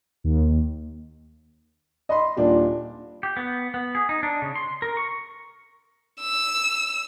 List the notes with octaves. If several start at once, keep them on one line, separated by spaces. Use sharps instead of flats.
D#2
D#5 B5 C6
D#1 A#2 D4 F4 G4
G4
B3
B3
G#4
D#4
D4
C#3
C6
A#4
C#6
E6